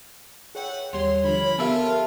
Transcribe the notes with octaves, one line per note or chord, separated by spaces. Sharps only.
G#4 B4 C#5 E5 F#5 G5
D#2 G3 C#5 C6
D3 F3 A#4 B5
B3 F4 G4 A4 A#4 E5 F5